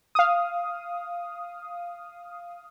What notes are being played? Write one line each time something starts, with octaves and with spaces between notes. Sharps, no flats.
F5 D#6